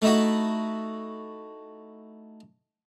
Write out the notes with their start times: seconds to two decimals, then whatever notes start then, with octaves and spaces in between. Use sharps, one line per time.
0.02 A3 D#4 E4 F#4